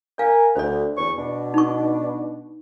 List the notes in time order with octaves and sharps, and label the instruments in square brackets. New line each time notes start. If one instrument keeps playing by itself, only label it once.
[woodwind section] A#4 G#5 [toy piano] D5 F5
[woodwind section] D2 [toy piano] C5 D5
[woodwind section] E2 C#6
B2 D4
[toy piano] D#4 C#6